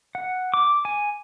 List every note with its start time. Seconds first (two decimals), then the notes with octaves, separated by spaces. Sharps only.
0.15 F#5
0.54 D6
0.85 G#5